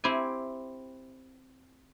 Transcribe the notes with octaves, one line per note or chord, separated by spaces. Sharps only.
C4 E4 G4 G#5